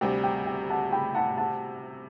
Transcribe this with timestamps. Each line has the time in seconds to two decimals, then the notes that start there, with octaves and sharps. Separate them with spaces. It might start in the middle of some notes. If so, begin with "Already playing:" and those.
0.01 D2 C3 G3 C4 G4 G5
0.24 G5
0.46 G5
0.70 F#5 A5
0.92 G5 B5
1.15 F#5 A5
1.37 F#5 A5